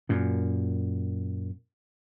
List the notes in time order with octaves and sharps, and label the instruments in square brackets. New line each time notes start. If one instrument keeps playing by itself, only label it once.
[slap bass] F#2 A#2